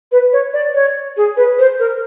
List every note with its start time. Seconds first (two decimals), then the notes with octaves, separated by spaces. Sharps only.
0.12 B4
0.32 C#5
0.53 D5
0.74 C#5
1.17 G#4
1.36 B4
1.58 C5
1.79 A#4